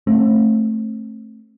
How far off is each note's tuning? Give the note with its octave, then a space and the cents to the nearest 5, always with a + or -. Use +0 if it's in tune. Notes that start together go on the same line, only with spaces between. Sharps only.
A3 +0 C4 +40